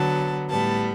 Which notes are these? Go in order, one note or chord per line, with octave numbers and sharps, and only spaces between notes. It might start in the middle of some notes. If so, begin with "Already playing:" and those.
Already playing: D3 F#3 B3 A5
A2 G3 B3 A5